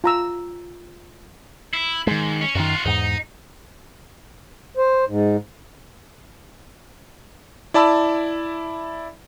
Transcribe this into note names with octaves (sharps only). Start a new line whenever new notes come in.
F4 A#5 E6
E4
G#2 D#3 G#3
C#4
F#2 D#3 F4 F#4
E2 G#2 D#4
C5
G#2
E4 D5 A5 B5 E6